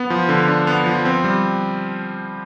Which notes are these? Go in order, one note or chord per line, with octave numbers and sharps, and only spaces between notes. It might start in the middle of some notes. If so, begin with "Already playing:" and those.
Already playing: B3
F3
D3
D4
B3
F3
C4
G3